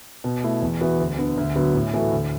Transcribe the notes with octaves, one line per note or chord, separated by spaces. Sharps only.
B2
A3 E4
E2
E3 B3 F#4
D2
D3 B3
D2
D3 F#3 B3 F#4
A2
E3 A3 F#4 A4
D2